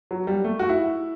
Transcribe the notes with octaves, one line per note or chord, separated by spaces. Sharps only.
F#3
G3
A3
F#4
E4